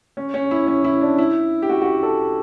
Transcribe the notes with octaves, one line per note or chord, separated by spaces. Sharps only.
C#4
C#4
E4
C#4
E4
D4
E4
G4
F#4
F#4
G4
A4